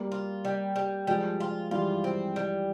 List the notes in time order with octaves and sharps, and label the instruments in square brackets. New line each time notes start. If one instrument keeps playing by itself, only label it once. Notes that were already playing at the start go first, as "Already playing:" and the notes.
Already playing: [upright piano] G3 A#3
[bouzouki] F4
G3
G3
[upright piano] F3 G#3 [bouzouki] G3
[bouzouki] F4
[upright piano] E3 G3 [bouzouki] F4
[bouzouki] C4
G3